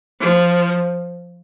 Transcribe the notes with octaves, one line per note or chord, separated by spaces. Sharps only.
F3